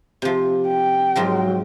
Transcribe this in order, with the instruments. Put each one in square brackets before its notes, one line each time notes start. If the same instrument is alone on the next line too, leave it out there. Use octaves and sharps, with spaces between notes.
[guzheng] C3 F3
[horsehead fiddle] G5
[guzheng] G#2 F3 A#4 [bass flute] F#3